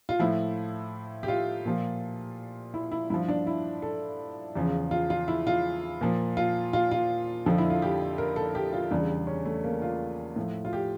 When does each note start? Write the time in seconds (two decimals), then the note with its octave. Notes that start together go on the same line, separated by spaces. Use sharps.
0.09 F4
0.19 A2 F3 E4
1.23 G4
1.28 F4
1.65 A#2 F3
2.74 E4
2.92 E4
3.10 G2 F3 E4
3.28 D4
3.47 E4
3.82 A4
4.55 E2 C#3 F3
4.91 F4
5.10 F4
5.28 E4
5.47 F4
6.01 A#2 F3
6.37 F4
6.73 F4
6.91 F4
7.46 F2 D3 F3
7.58 E4
7.70 F4
7.82 G4
8.18 A#4
8.36 A4
8.55 G4
8.73 F4
8.91 E2 C#3 G3 D4
9.27 C#4
9.45 A3
9.64 A#3
9.82 F4
10.36 A2 F3
10.65 F4
10.73 G4